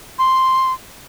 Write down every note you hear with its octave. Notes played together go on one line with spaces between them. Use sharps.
C6